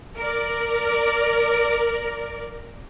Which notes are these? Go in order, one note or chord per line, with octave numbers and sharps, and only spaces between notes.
A#4 D5